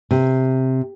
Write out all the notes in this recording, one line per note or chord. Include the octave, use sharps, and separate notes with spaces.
C3